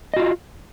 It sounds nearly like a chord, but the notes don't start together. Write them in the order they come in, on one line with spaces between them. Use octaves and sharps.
D#5 F#4 F4